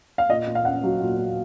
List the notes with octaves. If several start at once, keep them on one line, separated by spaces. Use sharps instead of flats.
F5
A#2 D#5
A#2
F5
C#4 F#5
F#3
A#2
A#2